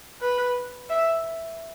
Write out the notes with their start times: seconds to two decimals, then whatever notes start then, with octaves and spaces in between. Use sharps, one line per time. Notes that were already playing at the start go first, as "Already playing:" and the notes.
0.21 B4
0.90 E5